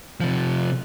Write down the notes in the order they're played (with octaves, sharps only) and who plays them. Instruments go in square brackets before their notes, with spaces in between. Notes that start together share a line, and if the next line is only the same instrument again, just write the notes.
[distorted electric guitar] C3 F3